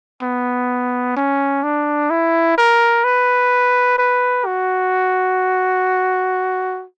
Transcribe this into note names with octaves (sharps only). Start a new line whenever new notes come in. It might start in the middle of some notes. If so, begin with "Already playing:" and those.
B3
C#4
D4
E4
A#4
B4
B4
F#4